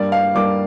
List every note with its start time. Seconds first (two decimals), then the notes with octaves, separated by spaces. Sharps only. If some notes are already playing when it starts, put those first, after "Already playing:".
Already playing: G2 G3 A#3 D5
0.12 F5
0.34 G2 G3 A#3 D6